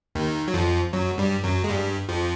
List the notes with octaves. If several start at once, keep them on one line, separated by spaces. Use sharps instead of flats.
D#2 D#3
F#3
F2 F3
F#2 F#3
G2 G3
F#2 F#3
G#3
G2 G3
F2 F3